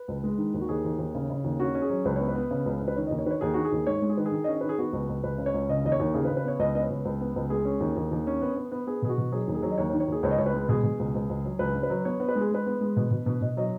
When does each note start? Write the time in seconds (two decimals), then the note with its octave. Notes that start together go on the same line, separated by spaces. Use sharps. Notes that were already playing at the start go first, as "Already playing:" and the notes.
Already playing: B4
0.08 C#2
0.24 G#3
0.38 D#3
0.54 D#2
0.61 F#4
0.69 D#2 G#4
0.84 D#2
0.98 D#2
1.15 C#3
1.30 C#3
1.44 D#2
1.60 C#4 F#4
1.75 C#4
1.82 G#4
1.90 F#3
2.05 C#2 B4
2.16 B3 C#5
2.28 B4
2.35 B3
2.51 C#3
2.66 C#2
2.81 C#3
2.88 B4
2.96 D#3 C#5
3.07 D#2 D#5
3.18 C#5
3.26 D#3 B4
3.31 C#5
3.41 D#2 G#4
3.54 D#3 F#4
3.64 G#4
3.72 D#2
3.87 G#2 C#5
4.02 G#3
4.10 G#4
4.17 D#3 B4
4.25 G#4
4.32 D#3
4.44 C#4 D#5
4.53 C#5
4.61 D#3 B4
4.69 G#4
4.78 B3 F#4
4.93 C#2
5.09 C#2
5.23 C#2 B4
5.38 C#3
5.46 C#5
5.54 C#2
5.69 C#3 D#5
5.85 D#2 D#5
5.92 C#5
5.99 D#2
6.14 C#3 G#4
6.25 B4
6.30 C#3
6.37 B4
6.44 B3 C#5
6.59 C#2 D#5
6.75 B3 D#5
6.83 C#5
6.90 C#2
7.05 C#2
7.21 B3
7.36 C#2
7.50 G#3 G#4
7.65 C#4
7.80 D#2
7.96 D#2
8.11 D#2
8.27 C#4
8.42 B3
8.56 B3
8.72 B3
8.87 B3 G#4
9.02 B2 G#4
9.09 F#4
9.18 B2
9.32 F#3 G#4
9.48 D#2
9.55 G#4
9.62 F#3
9.71 D#5
9.78 D#2 C#5
9.89 C#5
9.93 D#3
10.00 C#5
10.08 D#2 G#4
10.23 C#2 C#5
10.31 D#5
10.38 C#2 C#5
10.46 B4
10.54 G#3
10.69 B2 G#4
10.84 B2
10.99 C#2
11.15 C#2
11.29 C#2
11.44 F#3
11.59 C#2 B4
11.75 C#3
11.83 B4
11.90 F#3
12.05 B3 C#5
12.20 B3
12.28 B4
12.35 G#3
12.41 G#4
12.51 G#3 B4
12.66 B3
12.81 G#3
12.97 B2
13.11 B2
13.26 B2
13.41 B2 D#5
13.57 F#3 D#5